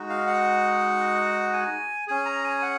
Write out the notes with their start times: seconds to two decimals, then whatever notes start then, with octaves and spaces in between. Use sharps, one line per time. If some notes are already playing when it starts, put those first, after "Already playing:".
Already playing: G#3 D#4 F#4
0.10 F5
0.27 F#5
1.53 G#5
2.07 C#4 G#4 G#5
2.25 A#5
2.44 G#5
2.62 F#5